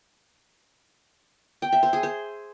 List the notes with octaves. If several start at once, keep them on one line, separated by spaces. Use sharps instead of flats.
G5
E5
C5
G#4
C5